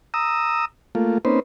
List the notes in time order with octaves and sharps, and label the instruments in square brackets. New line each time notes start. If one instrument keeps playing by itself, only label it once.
[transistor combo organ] A#5 D#6 E6
A3 A#3 F4
A#3 C4 C#4 D#4 B4 C5